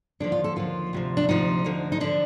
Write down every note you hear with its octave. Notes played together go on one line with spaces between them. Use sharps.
D#2 D3 F3 D4
F4
A4
D#2 D3 F3 F4
D2 C3 F3
D4
D2 C3 F3 D#4
D2 D3 F3
D#4
D3 F3 D4